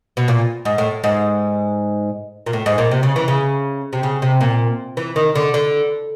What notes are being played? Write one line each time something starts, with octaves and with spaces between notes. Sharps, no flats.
B2
A#2
G#2
A2
G#2
A#2
A2
G#2
A#2
C3
C#3
E3
C#3
C3
C#3
C3
A#2
E3
D#3
D3
D3